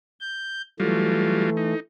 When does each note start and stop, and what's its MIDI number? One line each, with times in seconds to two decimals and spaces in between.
0.20 0.61 91
0.80 1.74 52
0.80 1.50 54
0.80 1.50 55
0.80 1.74 57
0.80 1.50 65
1.57 1.80 63